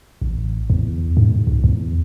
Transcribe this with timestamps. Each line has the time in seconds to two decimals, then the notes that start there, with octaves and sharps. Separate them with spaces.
0.21 A1
0.70 E2
1.17 G#2
1.47 C#2
1.64 E2